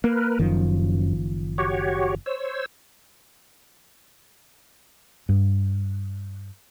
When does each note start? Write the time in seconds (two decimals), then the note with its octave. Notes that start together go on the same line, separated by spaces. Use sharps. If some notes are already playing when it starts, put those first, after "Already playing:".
0.04 A#3 A#4 B4
0.39 F#1 F#2 D#3 F3
1.58 F#4 G4 C#5
2.26 C5 C#5 E6
5.29 G2